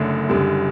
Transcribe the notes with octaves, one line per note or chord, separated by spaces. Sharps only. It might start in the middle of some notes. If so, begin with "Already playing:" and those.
Already playing: F#1 F#2 D3 A3
F#1 F#2 D3 G3